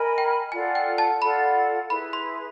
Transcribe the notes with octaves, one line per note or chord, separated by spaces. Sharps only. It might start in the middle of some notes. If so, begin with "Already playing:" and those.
Already playing: A#4 D#5 G#5 B5
G5
F4 A4 D5 F#5 G#5
G5
A5
F4 A4 D5 F#5 B5
E4 G#4 B4 B5
C6